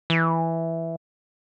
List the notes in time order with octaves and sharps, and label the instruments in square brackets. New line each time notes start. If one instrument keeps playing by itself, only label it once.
[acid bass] E3